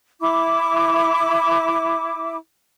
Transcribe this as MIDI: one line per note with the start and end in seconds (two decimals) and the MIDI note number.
0.20 2.36 64
0.20 2.36 86